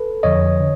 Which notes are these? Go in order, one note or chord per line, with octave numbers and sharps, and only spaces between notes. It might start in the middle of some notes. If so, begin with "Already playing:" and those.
Already playing: A4 B4
F2 D3 F3 C#5 D#5
D3